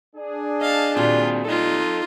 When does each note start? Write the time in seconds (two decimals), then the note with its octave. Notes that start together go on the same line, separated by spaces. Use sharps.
0.16 D4 G#4
0.61 D#5 F5 A5
0.97 A#2 G3 C4 F4 F#4
1.45 D#4 F4 A4 D#5